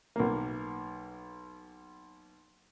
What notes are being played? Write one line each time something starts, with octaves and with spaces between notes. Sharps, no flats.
B1 A#3